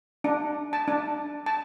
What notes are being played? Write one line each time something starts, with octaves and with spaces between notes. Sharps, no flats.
D4
A5
D4
A5